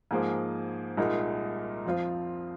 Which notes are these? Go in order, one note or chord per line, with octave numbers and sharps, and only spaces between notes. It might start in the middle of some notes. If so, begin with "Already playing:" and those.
G#2 F3 A#3 G#4 C5
C2 A#2 G#3 D#4 A#4
F2 F3 C4 F4 C5